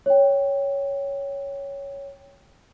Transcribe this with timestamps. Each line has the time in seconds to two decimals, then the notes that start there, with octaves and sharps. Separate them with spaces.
0.06 C#5 G5